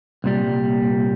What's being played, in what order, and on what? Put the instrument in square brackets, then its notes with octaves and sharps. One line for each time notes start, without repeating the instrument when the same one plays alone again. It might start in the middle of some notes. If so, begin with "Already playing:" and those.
[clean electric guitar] C2 A#2 G3